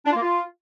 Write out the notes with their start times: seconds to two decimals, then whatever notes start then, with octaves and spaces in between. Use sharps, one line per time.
0.05 D4
0.10 F4
0.15 A#3
0.21 F4